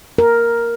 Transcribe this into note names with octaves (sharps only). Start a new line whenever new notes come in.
A#4